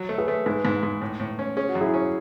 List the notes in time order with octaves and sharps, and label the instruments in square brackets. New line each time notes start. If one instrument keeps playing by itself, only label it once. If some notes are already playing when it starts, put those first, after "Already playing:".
Already playing: [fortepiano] F#3
A3
[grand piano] G#4 B4
[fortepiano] A3
[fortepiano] G#2 [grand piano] G#4 B4
[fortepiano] G#2
G#2
A2
A2
C#4
[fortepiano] C#4 [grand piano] G#4
[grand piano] F#4
[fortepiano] F#2
[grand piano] E4 G#4
[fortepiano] C#4